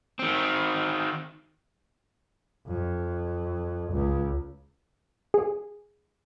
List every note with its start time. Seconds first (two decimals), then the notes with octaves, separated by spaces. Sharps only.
0.19 D#3 C4
2.67 F2
3.92 C#2
5.34 G#4